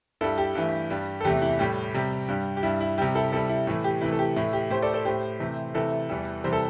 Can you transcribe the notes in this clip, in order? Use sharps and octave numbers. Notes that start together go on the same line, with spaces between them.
G2 G3 E4 A4
G4
G2 E3 A3
G2 G3
A4
E2 C3 A3 G4
E4
A2 G3 G4
C3 G3
G2 G3
G4
G2 G3 E4
E4
C3 G3 G4
E4 A4
C3 G3 E4 A4
E4
A2 E3 A3 E4
G4
C3 E3 A3 E4
A4
G4
A2 E3 A3 E4
G4
A2 A3 G4 C5
A4 D5
A4 D5
A2 A3 G4 C5
C3 E3 A3
C3 E3 A3 E4 A4
E2 E3 G3
C3 E3 G3 C5
A4